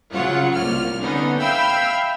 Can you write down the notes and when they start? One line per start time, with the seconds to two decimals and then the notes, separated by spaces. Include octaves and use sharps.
0.12 C#3 F#3 F4 C#5 F#5
0.53 C2 A#3 F4 F6
0.97 D3 B3 C#4 D#4
1.37 E5 F5 G5 B5 E6 F6